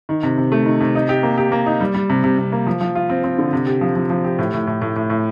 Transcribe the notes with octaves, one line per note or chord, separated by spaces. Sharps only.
D#3
C3
C3
A3
D#3
C3
D#4
G4
A#3
G4
A#3
D#4
G3
G3
C3
C3
C3
A#3
F3
F3
F4
C4
C4
D3
C3
G4
F3
F3
F3
G4
A2
A2
A2
A2
A2
A2